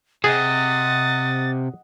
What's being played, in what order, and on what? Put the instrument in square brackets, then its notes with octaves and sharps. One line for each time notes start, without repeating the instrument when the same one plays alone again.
[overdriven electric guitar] C3 [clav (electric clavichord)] G#4 [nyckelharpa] D#5 F#5 [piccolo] A6